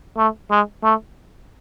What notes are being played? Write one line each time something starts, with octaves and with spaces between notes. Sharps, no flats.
A3
G#3
A3